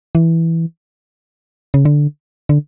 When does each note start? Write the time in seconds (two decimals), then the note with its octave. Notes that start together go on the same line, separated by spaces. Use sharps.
0.15 E3
1.74 C#3
1.85 D3
2.49 D3